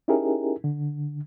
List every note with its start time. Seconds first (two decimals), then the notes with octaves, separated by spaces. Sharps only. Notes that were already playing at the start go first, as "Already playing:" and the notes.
0.08 C#4 D#4 E4 G4 G#4 A#4
0.64 D3